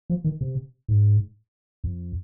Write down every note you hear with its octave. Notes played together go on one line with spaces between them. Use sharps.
F3
D#3
C3
G#2
F2